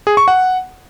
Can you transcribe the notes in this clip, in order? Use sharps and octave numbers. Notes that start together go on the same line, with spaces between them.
G#4
C#6
F#5